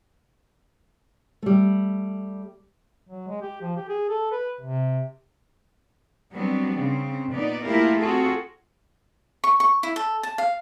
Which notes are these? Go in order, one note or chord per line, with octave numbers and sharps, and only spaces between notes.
G3 A3
F#3
G#3
G4
F3
G4
G#4
A4
B4
C3
F#3 G3 B3 C4 D4
C#3 C4
A#2 B3 D#4 D5
A3 A#3 E4 F4 G4 A#4
C4 F4 F#4 G#4 A4
C#6
C#6
E4
A4
A5
F5